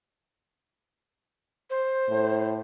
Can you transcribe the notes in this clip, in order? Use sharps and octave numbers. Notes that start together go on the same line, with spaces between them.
C5
A2